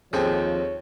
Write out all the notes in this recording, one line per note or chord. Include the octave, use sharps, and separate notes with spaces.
D#2 F3 C4 G#4 A4 C#5 G#5